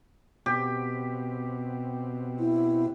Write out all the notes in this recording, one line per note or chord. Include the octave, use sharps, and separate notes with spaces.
B2 C4 G4
E4